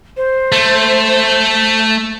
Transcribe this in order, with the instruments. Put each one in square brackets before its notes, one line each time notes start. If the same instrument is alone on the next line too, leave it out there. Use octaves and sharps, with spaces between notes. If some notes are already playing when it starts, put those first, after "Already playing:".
[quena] C5
[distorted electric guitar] A3